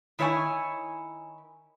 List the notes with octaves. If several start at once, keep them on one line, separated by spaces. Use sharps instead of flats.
D#3 E4 C#5 D5 G#5